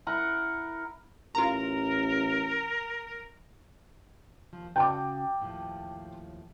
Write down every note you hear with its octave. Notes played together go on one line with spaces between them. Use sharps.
E4 A#4 F#5
A1 F4 A#4 A#5
D#2 F3
C#3 F#4 G5 A5 D6
D#2 A2 F3